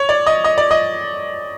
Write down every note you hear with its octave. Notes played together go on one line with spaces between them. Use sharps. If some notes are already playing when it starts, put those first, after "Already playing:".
Already playing: C#5
D5
D#5
D#5
D5
D#5